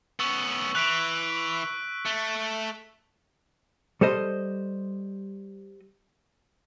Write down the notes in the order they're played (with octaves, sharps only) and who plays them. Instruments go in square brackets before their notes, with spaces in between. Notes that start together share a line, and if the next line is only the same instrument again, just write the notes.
[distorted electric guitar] B3 C#4 [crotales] C#6 E6 F#7
[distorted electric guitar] E3 [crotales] F#6 B6 D7
[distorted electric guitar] A3
[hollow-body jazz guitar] G3 A4 C5 D#5